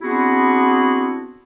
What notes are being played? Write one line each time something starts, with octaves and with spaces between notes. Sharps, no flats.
B3 C4 D4 E4 F#4 G#4